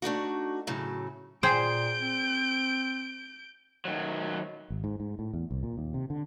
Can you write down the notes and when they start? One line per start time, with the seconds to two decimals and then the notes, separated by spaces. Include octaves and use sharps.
0.02 A3 D4 D#4 F#4
0.67 A2 C#3 F#3 A3
1.43 A#2 G#4 C5 G5 G6 D7
2.00 C4
3.85 D#3 F#3
4.70 G#1
4.84 G#2
5.00 G#2
5.19 A2
5.33 E2
5.51 C2
5.63 A#2
5.78 D#2
5.94 C3
6.10 D3